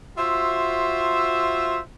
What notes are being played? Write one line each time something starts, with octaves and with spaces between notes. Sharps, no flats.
F4 F#4 C5 E5